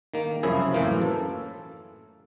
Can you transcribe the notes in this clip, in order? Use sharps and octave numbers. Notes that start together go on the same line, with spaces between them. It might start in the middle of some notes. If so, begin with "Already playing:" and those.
D#3 A#3
C2 F#2 C#3 F3 E4 G#4
F#2 A2 E3 A#3 F4
A4